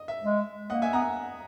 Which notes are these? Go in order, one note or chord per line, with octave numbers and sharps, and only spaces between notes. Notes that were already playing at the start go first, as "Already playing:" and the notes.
Already playing: D#5
E5
G#3
A#3 D#5 F#5
E5 G#5
B3 F#5 A#5